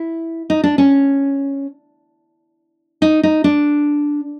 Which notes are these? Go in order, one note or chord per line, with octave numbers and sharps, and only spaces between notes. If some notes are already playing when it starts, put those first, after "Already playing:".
Already playing: E4
D#4
D4
C#4
D#4
D#4
D4